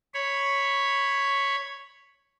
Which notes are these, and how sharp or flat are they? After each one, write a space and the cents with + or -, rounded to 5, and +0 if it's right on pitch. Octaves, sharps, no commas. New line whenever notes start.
C#5 +0 B5 +0